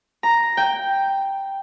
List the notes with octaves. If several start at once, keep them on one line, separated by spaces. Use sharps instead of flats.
A#5
G5